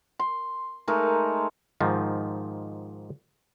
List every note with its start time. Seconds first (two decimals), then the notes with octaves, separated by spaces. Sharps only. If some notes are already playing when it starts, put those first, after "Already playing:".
0.20 C6
0.88 G#3 A3 D#4 A#4
1.81 G#2 D#3 F3